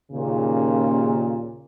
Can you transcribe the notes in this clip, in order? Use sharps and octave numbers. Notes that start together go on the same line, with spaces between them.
D#2 A#2 C#3